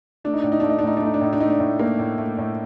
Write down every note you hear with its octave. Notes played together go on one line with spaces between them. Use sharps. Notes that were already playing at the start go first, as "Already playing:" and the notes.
A3 D4
D#4
A2 D4
D#4
A3 D4
D#4
D4
A2 D#4
D4
A3 D#4
D4
A2 D#4
D4
A3 D#4
D4
A2
A3 A#3
A2
A3
A2